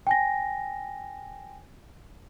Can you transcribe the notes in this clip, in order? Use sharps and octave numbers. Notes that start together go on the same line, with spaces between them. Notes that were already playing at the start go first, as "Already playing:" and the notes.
G5 G#5 A#6